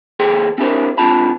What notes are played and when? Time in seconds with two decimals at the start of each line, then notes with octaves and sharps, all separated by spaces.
0.20 D#2 G#4 A4 C5 G5 C6
0.58 C4 D4 E4 G4 A#4 C5
0.98 G#2 D3 C4 F4 A5 B5